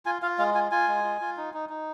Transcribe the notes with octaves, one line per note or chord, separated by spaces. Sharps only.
F4 G#5
F4 F5
G#3 F5
F4 G#5
F4 G#5
G#3
F4
F4
D#4
D#4
D#4